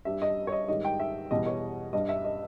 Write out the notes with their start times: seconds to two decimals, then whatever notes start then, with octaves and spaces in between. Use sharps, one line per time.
0.05 G2 G3 E5
0.22 D#5
0.47 C#5
0.52 D#5
0.68 G#2 D#3 G3 D#5
0.85 G5
1.00 E5
1.31 E2 B2 G3 D#5
1.46 C#5
1.93 G2 G3 D#5
2.09 E5
2.25 D#5